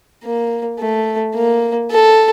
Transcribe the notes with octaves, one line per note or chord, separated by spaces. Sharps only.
A#3
A3
A#3
A4